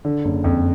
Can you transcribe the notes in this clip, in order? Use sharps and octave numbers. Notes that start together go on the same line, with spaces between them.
D3
F#1
F2